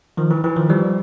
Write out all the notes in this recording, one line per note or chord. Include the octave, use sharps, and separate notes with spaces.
D#3 F3
E3
E3
D#3 F3
F3 G3